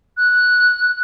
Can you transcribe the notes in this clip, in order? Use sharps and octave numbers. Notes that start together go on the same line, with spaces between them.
F#6